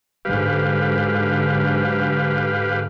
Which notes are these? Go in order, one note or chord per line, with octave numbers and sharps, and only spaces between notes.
G#2 D3 F#3 G4 B4 F5